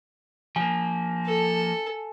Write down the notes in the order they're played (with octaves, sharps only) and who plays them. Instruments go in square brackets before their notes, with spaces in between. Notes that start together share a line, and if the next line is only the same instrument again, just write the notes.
[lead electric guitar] F3 A#3 [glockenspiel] G#5
[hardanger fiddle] A4